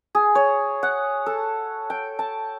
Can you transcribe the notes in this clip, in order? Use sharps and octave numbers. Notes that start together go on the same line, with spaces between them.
G#4
C#5
F#5
A4
G5
A5